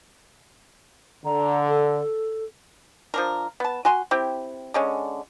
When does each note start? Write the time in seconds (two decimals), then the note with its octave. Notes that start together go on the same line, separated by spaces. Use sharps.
1.25 D3 A#5
1.68 A4
3.14 F3 D4 A#4
3.60 B3 A5
3.85 F#4 G#5 C6
4.11 C4 E4 G4
4.74 D3 G#3 C#4